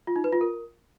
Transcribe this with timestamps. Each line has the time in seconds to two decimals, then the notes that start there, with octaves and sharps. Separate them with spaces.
0.07 F4
0.16 D#4
0.24 B4
0.33 F4
0.41 A#4